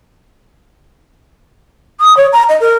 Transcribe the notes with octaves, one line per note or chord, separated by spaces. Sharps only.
D#6
C#5
A#5
D#5
A#4